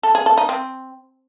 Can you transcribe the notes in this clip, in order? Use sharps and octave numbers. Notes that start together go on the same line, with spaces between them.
A4
G#4
A4
D#4
C4